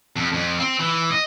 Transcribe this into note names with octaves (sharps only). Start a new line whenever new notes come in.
F2
F2
C4
E3
D#5